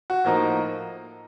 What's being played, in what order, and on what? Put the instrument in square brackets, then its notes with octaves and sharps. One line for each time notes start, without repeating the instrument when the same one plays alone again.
[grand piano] F#4
A2 F3 A#3 D#4